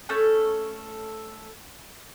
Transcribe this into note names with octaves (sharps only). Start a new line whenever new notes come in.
A3 C#4 A4 G6